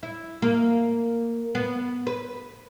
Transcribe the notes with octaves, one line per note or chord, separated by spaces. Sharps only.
E4
A#3
B3
B4